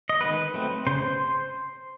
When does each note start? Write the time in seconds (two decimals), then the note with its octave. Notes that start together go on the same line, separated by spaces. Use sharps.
0.09 D#5
0.21 D#3 G#3 B3 B4
0.54 F#3 A3 C4
0.87 C#3 C5